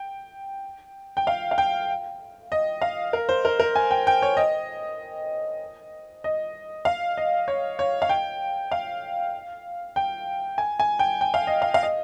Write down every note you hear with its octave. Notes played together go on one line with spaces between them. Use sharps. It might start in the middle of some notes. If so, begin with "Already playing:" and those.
Already playing: G5
G5
F5
F5
G5
D#5
F5
A#4
C5
A#4
A#4
G#5
G5
G5
C#5
D#5
D#5
F5
D#5
C#5
C#5
F5
G5
F5
G5
G#5
G#5
G5
G5
F5
D#5
F5
F5
D#5